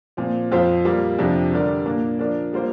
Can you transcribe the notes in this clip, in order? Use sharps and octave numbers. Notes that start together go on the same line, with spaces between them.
A#2 F3 C4
F2 F3 C4 F4 C5
A#2 G3 A#3 F4
F2 C3 F3 D4 G4
D3 G3 D4 A#4 D5
A#2 A#3 D4
F3 D4 A#4 D5
G3 A#3 F4 C5